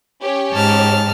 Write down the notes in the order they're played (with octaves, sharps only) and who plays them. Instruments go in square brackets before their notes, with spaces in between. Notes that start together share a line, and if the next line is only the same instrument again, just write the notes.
[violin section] C#4 G4 C#5
[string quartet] G#2 A5 F6